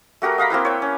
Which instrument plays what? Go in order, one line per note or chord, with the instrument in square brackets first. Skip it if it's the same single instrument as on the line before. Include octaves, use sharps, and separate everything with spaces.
[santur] A3 F#4 G4 A#4
D#5 F5 A#5 B5
A#3 C4 E4 B4
C#5 G5
C#4